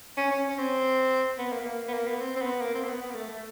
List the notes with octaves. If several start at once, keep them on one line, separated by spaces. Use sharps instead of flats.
C#4
C#4
C#4
C4
B3
A#3
B3
A#3
B3
A#3
B3
C4
C4
B3
A#3
C4
A#3
B3
B3
A#3
A3
A3